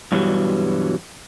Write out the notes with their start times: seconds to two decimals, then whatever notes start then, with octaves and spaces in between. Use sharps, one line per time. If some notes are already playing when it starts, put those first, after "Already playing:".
0.12 G2 B2 E3 F#3 G3